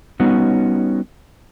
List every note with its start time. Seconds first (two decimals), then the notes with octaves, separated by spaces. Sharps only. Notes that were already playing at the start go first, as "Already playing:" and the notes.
0.20 G3 B3 C#4 D#4 F#4